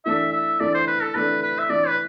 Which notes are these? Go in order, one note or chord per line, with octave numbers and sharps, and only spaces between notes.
E3 A3 D4 A4 E5
E5
E3 A3 D4 A4 D5
C5
B4
A4
E3 A3 D4 A4 B4
B4
E5
E3 A3 D4 A4 D5
B4